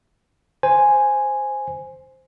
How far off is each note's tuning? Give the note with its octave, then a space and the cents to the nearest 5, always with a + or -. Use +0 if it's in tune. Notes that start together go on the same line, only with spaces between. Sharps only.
C5 +0 G#5 +0